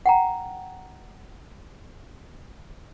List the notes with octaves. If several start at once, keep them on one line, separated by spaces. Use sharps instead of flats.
F#5 G5 A#5